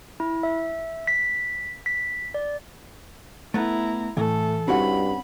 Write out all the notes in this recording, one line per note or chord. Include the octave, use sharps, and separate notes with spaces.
E4
E5
B6
B6
D5
A3 B3 E4 A#5
A2 E3 A4
G2 G3 C4 C#4 E4 F#4 F#5 B5